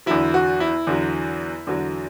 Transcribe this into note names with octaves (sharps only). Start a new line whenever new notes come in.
E2 D3 F#3 E4
F#4
E4
E2 D3 F#3
E2 D3 F#3